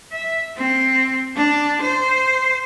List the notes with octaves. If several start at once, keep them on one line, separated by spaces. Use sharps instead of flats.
E5
C4
D4
C5